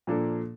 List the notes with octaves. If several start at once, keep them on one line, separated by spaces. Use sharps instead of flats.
A#2 F3 A#3 D4 A4